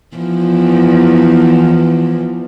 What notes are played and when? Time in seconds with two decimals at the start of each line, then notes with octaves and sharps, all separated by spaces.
0.17 E2 E3 F3